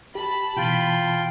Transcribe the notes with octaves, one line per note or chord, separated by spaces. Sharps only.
G4 A5 B5
B2 E3 F4 G5